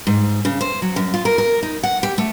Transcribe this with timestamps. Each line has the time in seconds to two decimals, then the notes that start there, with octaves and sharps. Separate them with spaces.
0.07 G#2
0.45 C#3
0.61 C5
0.82 F#3
0.96 F#2
1.14 F4
1.25 A#4
1.38 A#4
1.63 D#4
1.83 F#5
2.03 G4
2.18 A3